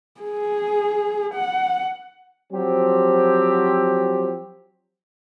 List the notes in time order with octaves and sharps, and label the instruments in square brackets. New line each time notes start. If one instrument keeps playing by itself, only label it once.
[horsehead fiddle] G#4
F#5
[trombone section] F3 F#3 C4 G4